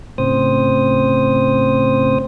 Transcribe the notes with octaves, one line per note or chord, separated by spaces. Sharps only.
A2 C#3 C4 C5 D#6